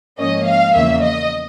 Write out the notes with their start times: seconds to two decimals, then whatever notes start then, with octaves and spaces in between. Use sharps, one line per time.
0.18 G#2 F3 A#3 C#4 D#5
0.46 F5
0.74 E2 C#3 F3 A#3 E5
1.02 D#5